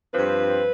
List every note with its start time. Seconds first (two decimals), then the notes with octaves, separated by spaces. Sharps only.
0.13 G2 F3 C4 B4